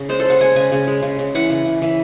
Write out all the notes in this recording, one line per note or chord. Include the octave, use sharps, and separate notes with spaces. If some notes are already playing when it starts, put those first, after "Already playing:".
Already playing: C#3
G#3 C5
A4
G#3 F#5
G#3 G#5
C#3 G#5
C#3
G#3
C#3
C#3
E3 F#5
C#3
C#3
E3